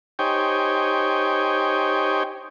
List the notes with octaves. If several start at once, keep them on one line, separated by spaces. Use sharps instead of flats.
D#4 G4 C5 C#5 G5 G#5